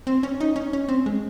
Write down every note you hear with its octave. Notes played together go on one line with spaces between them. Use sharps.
C4
C#4
D#4
C#4
C#4
C4
G#3